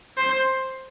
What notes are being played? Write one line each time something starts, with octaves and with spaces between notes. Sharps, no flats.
C5